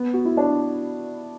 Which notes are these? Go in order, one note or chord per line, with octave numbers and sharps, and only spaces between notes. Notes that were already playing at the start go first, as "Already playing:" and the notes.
Already playing: B3
F#4
E4
D4